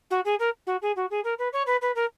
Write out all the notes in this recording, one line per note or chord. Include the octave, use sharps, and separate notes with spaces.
F#4
G#4
A#4
F#4
G#4
F#4
G#4
A#4
B4
C#5
B4
B4
A#4